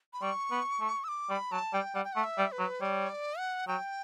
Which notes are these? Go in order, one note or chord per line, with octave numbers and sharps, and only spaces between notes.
B5
G3 C#6
B3
A3
E6
D6
G3 B5
F#3 A5
G3 G5
G3 F#5
G5
A3 F#5
E5
G3
B4
F#3
G3 C#5
D5
F#5
F#3 G5